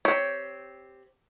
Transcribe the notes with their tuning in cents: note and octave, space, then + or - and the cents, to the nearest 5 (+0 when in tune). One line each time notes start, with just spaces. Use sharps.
C4 +0 G4 +0 C#5 +10